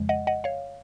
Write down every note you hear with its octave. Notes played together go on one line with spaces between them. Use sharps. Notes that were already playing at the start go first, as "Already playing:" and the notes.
Already playing: F2 C#3 F3 G#3
D#5 F#5
D#5 F#5
C#5 F5